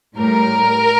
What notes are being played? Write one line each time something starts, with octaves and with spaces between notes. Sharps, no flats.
A2 G3 A#4